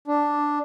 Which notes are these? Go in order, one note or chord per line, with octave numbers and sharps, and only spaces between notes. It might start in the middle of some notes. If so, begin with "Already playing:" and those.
D4